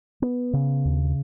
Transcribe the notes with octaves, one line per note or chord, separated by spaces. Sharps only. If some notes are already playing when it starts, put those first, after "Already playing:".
B3
C#3
D#2